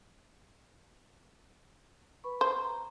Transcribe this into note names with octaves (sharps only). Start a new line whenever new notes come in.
B4 B5 C#6
C5
A#5